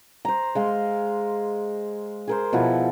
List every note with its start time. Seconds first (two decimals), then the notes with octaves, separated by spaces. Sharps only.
0.25 C5 A#5
0.55 G#3 F5 C6
2.28 G#4 A#4 C5
2.53 B2 F3 E4 F#5